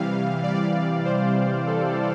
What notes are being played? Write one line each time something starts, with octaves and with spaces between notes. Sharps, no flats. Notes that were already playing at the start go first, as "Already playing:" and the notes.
Already playing: C3 E3 G3 F5
D5
C5
A4